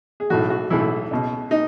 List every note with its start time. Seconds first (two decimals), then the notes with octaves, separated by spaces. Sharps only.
0.20 G#4
0.30 B1 A2 E3 F#4
0.50 F#4
0.70 B1 A2 E3 E4
1.11 C#2 B2
1.51 D#4